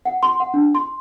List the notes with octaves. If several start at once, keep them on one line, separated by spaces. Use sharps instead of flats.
F#5
C6
F#5
D4
C6